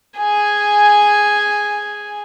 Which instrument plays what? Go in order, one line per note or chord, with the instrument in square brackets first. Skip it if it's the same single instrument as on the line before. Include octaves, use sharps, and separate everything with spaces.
[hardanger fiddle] G#4 G#5